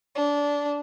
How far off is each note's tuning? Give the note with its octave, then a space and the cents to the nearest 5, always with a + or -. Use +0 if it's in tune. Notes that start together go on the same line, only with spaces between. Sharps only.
D4 -20